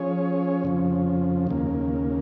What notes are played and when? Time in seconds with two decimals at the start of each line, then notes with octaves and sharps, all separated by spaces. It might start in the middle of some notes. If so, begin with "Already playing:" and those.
Already playing: F3 C#4 G#4 C#5
0.64 F2 C#3 F3
1.47 D#2 C#3 A#3